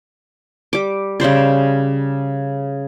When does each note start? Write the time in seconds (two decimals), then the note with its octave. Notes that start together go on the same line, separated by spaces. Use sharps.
0.73 G3 D6
1.20 C#3 G3 C5 D5